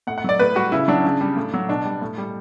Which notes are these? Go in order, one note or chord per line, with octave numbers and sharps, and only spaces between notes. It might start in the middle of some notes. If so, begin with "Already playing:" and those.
A2 F#5
F#5
F#3 D5
A2 B4
G3 F#4
C#3 E4
F#3 D4
C#3
G3
A2
F#3
B2 D4
G3
A2
G3